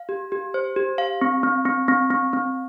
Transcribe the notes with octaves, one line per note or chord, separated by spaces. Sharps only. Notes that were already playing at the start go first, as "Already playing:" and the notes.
Already playing: F5
G4
G4
C5
G4
F5
C4
C4
C4
C4
C4
C4